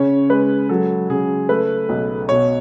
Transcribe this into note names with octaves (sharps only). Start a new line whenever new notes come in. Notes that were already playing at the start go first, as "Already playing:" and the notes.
Already playing: C#3 C#4 C#5
G#3 B4
F#3 A4
C#3 G#4
A3 B4
B1
B2 C#5